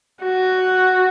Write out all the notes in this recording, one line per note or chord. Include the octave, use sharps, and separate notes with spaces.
F#4